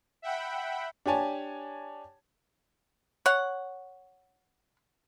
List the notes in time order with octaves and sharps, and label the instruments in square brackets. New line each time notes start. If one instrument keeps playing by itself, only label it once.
[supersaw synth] E5 F#5 G5 B5
[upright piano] D4 G4 C#5 G#5 A5
[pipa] C#5 F#5